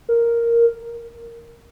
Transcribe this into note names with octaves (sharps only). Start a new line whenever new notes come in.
A#4